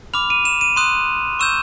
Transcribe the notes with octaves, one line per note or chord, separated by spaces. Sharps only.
B5 D6 F6 F7
D#7
E7
D#7
C6 D#6 F#6 D#7
C#6 E6 G6 E7